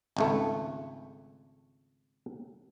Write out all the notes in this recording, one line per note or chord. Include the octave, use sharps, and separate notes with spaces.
G#1 C#2 A3